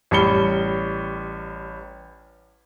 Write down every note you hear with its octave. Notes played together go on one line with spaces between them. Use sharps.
A1 G3 B5 C#7 G7